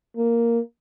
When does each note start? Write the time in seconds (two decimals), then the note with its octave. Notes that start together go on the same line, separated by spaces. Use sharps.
0.16 A#3